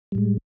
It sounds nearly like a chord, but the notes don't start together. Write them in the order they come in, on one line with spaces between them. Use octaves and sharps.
G3 A2 G#3